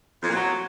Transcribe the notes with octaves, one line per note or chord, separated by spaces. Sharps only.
F2
A#2
F#3